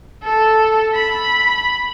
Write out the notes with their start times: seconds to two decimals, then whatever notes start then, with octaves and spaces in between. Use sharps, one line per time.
0.24 A4
0.95 B5